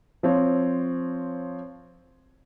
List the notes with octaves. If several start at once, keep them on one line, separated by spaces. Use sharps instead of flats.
F3 C4 C#5